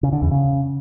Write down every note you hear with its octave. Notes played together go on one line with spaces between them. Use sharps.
C#3
D3
E2
C#3